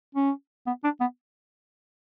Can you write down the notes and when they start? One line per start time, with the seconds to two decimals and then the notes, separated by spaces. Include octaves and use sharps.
0.15 C#4
0.67 B3
0.84 D4
1.00 B3